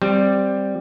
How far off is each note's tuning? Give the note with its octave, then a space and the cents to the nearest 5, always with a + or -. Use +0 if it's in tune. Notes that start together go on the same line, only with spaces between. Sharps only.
G3 +0 C4 +0